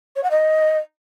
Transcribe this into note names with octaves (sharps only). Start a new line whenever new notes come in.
C#5
F#5
D#5